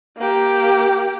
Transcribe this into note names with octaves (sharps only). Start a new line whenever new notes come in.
A#3 G4